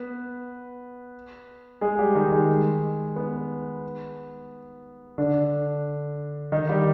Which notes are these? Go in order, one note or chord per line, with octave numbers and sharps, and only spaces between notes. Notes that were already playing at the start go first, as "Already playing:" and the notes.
Already playing: B3 B4
G#3 G#4
G3 G4
D#3 D#4
G#3
B3
D3 D4
D#3 D#4
G3 G4